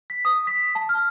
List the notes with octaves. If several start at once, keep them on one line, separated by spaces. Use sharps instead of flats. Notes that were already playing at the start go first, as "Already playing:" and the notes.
B6
D#6
B6
A5
F6